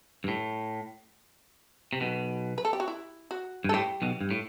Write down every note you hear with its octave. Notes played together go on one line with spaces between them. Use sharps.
G2
A2
C3
B1 B2
B4
A4
G4
F#4
E4
F#4
G2
A4
A2 G4
B1 B2
G2
A2